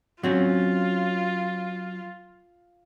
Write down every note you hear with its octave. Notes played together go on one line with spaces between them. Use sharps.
F#3 C4 C#4 F4